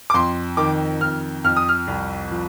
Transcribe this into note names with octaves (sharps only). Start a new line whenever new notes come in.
D6
F2 C6
D#3 D6
F2 F6
F2 F6
D#6
F6
C2
F3